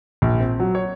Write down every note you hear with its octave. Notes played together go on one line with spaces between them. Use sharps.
A#1
C4
F#3
C#5